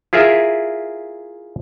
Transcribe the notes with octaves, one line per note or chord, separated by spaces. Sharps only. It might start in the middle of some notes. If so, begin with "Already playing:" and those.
E4 F4 G#4 A#4 E5